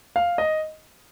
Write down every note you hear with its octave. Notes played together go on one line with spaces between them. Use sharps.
F5
D#5